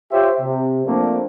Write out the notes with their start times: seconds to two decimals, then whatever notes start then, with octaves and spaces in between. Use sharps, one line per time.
0.12 F4 G4 C5 C#5 E5
0.41 C3
0.86 F3 A3 A#3 C4 D4